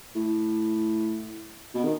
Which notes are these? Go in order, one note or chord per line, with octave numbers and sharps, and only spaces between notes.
A2
B2
D#3